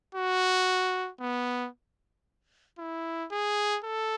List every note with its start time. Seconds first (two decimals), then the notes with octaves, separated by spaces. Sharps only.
0.15 F#4
1.21 B3
2.78 E4
3.31 G#4
3.85 A4